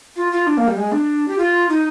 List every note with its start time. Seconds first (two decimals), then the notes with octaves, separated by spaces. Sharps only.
0.16 F4
0.32 F4
0.47 D4
0.57 A#3
0.68 G3
0.77 G#3
0.92 D4
1.28 G4
1.38 F4
1.69 D#4